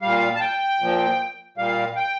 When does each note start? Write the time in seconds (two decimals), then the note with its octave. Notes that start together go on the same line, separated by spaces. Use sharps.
0.02 A#2 G3 F5
0.35 A5
0.40 G5
0.80 A#2 F3
1.57 A#2 G3 F5
1.96 G5